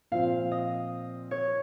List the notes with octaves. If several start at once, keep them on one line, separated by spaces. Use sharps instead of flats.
A#2 F3 C4 F4 F5
D#5
C#5